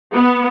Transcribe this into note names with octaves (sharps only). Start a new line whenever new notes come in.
B3